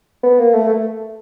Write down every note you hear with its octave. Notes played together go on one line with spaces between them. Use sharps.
B3
A#3
A3
A3